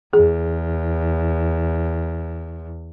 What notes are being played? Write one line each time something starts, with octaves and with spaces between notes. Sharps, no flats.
E2 G#4